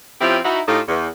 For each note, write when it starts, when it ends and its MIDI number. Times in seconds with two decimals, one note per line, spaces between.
0.20 0.38 53
0.20 0.38 60
0.20 0.38 61
0.20 0.38 64
0.20 0.38 65
0.20 0.38 67
0.44 0.61 63
0.44 0.61 64
0.44 0.61 66
0.67 0.80 45
0.67 0.80 63
0.67 0.80 65
0.67 0.80 67
0.67 0.80 69
0.67 0.80 75
0.88 1.09 40